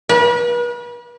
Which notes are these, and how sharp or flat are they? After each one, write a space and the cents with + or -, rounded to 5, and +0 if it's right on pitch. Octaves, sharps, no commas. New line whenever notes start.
B4 -40